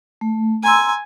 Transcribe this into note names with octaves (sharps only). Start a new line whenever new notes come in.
A3
G#5 A#5 C6 E6